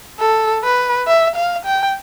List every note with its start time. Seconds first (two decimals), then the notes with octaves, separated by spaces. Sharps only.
0.20 A4
0.63 B4
1.07 E5
1.36 F5
1.65 G5